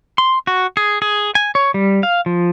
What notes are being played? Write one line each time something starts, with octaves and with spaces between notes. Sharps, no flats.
C6
F#4
G#4
G#4
G#5
C#5
G3
F5
F3